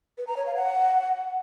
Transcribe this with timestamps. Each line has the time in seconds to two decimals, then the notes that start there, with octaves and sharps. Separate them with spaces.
0.18 B4
0.27 A#5
0.37 C#5
0.46 F5
0.55 F#5